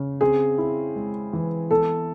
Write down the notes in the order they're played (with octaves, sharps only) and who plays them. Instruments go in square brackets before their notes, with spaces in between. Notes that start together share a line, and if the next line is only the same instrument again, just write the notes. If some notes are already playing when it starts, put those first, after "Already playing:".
Already playing: [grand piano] C#3
[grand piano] C4 [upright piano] G#4
[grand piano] E4
G#3
E3
[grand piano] B3 [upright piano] A4